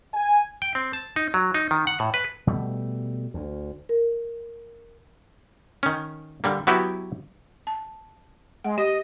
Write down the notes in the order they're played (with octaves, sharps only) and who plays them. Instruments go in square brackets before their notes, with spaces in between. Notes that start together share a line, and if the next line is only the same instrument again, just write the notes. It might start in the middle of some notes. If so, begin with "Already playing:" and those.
[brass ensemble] G#5
[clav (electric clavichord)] G5
C4
A5
D#4
F#3
D#4
D#3
F#5
A2
B4
[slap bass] B2 G3 A3
D2
[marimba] A#4
[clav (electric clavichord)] D#3 C#4
D3 G3 A#3
F#3 B3 E4 F#4 G4 B4
[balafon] A5
[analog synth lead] G#3 [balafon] F#5
[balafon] G4 [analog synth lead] D#5